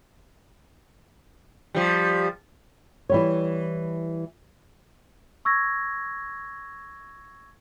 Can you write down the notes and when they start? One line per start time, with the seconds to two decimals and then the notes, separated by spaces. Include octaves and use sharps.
1.75 F3 G3
3.09 E3 G3 C#5
5.45 C#6 E6 G#6 A#6